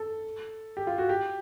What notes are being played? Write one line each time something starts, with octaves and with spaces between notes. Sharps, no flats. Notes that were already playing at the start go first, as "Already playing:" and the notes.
Already playing: A4
G4
F4
F#4
G4